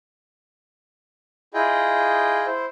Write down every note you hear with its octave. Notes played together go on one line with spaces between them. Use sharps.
E4 F4 G#4 D#5 G5
E4 C5